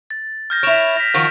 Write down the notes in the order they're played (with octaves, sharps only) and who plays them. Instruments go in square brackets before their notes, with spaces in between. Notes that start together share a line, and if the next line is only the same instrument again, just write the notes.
[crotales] A6
F6 G6 A#6
[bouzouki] E4 C#5 [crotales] D7 E7 F7
[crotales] A#6 B6
[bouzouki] D#3 F3 F#4